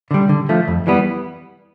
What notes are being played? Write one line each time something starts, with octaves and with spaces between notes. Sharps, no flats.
D3 G3
D3
F3 A3
F2
E3 G3 B3